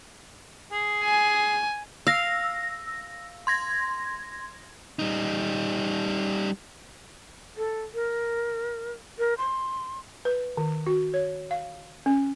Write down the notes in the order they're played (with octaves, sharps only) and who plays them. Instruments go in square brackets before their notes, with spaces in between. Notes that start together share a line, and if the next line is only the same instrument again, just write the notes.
[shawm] G#4
[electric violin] G#5
[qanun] F5 [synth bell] E6 A#6
[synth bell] C6 G#6 A#6
[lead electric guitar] G3 D#4
[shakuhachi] A4
A#4
A#4
C6
[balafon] B4
D#3
F#4
C#5
F5
C#4